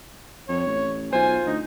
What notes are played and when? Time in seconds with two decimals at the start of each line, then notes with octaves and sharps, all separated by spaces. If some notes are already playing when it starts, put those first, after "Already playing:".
0.49 F2 C#5
0.66 A1
1.13 B1 F4 C5 G#5
1.46 D2 D#4